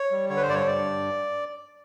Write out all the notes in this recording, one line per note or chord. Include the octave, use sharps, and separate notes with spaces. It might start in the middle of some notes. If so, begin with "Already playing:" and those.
Already playing: C#5
G3
D3 C#5
B4
C5
G2 D5
C#5
G2 D5